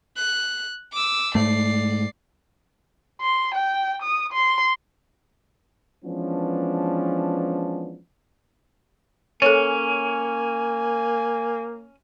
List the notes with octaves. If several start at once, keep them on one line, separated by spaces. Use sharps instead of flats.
F#6
D6 E6
G#2 A3 D5 C7
C6
G5
D#6
C6
E3 F3 G#3 B3 C#4 D4
A#3 C#4 A4 C#5 G#5